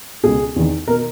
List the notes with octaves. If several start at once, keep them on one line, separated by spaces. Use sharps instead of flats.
C#2 B2 G#4
E2 D#3
B2 A#4